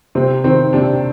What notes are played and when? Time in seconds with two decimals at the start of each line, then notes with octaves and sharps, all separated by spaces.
0.15 C3 C4
0.44 D#3 C4
0.73 C3 D4